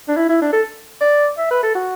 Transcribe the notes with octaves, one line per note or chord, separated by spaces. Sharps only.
D4
E4
E4
D4
A4
D5
E5
B4
A4
F#4